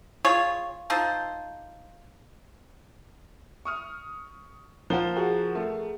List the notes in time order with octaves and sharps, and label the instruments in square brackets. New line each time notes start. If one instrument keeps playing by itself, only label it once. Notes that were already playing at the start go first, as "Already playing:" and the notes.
[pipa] F4 G#4 C#5
D#4 F4 A4 C5
[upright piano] C#6 D#6 F6
[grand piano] F3 F4 [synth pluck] A#4 F#5 [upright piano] G7
[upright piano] F#4 [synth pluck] G#4
[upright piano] A3